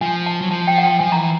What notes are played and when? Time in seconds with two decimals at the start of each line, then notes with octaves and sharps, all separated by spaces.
0.01 F3 G#5
0.26 A5
0.41 F#3
0.50 F3 A5
0.67 G5
0.78 F#5
0.83 G5
0.99 F3 G#5
1.12 A#5
1.16 E3